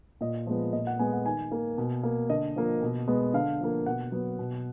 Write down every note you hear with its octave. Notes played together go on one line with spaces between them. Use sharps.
A#2 D#5
F3 G#3 B3
A#2 D#5
F#5
G#3 B3 G#5
F#5
D#3 G#5
A#3
B2
A#3
D3 D#5
F3 A#3
B2
G#3 B3
D3 F5
F3 A#3
B2 F#5
F#3 B3
B2